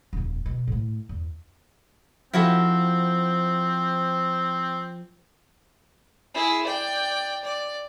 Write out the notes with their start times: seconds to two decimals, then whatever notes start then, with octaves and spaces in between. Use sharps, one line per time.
0.13 D#1 F2
0.46 B2
0.68 A2 A3
1.09 E2
2.33 F3 C4 E4 F#4 A4
6.34 E4 G#4
6.66 D5 G5
7.44 D5